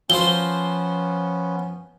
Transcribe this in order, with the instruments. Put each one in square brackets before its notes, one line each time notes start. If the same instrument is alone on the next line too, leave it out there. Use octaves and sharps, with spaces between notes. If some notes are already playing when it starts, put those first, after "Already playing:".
[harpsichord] F3 C5 [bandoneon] B3 C#4 [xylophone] G7